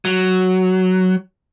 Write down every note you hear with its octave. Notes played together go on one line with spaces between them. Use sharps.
F#3